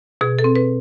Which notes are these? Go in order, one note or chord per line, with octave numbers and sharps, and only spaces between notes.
B2 G#4
A4
C4
B4